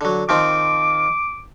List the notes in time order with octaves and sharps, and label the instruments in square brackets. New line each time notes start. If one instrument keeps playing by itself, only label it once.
[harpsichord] D3 F#3
[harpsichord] D#3 F3 C4 [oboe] D6